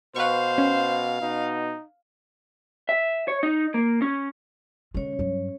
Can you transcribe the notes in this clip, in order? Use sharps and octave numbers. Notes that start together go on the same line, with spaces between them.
B2 B4 C5 F5 C#6
C#4
B2 D#4
E5
C#5
D#4
A#3
C#4
D3 G#3 C#4 C#5
G2 F#3